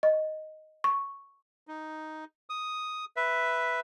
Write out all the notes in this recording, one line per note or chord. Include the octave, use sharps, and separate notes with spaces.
D#5
C#6
D#4
D#6
B4 E5